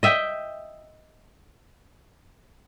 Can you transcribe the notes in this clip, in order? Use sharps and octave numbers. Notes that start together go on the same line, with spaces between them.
D#5 E5 G5